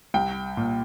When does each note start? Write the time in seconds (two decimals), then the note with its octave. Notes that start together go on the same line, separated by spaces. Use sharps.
0.14 C2 G5
0.57 A#2